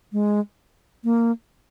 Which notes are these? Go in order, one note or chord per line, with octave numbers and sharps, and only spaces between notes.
G#3
A#3